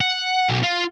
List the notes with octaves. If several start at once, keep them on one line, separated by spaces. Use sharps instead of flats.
F#5
B1
F4